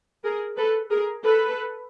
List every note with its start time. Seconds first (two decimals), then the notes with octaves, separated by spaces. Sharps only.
0.24 G#4 A#4
0.57 A4 B4
0.90 G#4 A#4
1.23 A4 B4